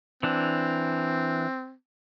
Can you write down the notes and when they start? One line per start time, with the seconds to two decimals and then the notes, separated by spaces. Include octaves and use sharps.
0.23 E3 C4 D4